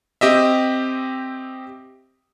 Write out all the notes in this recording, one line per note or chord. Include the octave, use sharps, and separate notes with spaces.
C4 G4 D#5 E5